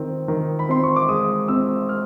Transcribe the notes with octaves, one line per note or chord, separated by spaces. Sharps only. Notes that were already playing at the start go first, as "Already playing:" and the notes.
Already playing: D#3 C4
D#3
B5
C4 C6
C#6
D6
G#3 D#6
C4 E6
G#3 F6